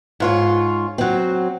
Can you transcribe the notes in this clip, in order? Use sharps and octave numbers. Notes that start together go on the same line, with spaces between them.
G#2 F4 C#5
F#3 C4